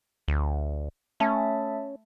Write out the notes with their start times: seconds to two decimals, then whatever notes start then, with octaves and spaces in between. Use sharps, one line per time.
0.28 D2
1.20 A3 C#4 E5 A5